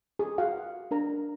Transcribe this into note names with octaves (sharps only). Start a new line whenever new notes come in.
G#4 A4
F#4 F5 F#5
D4 A#4 A#5